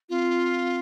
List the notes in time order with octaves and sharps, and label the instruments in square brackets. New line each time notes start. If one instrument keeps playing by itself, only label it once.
[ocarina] C4 [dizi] F4